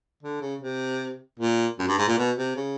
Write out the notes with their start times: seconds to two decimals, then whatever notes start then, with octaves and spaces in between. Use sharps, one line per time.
0.23 D3
0.41 C#3
0.61 C3
1.39 A#2
1.79 F#2
1.88 G2
1.98 G#2
2.08 A#2
2.18 B2
2.37 C3
2.56 C#3